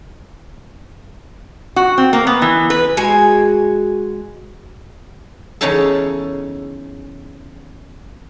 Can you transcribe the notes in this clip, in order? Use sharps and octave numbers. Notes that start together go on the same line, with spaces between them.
F#4
C4
A#3
B3
E3
B4
G#3 F#4 G#5
E2 C#3 C#4 D#4 G#4 A4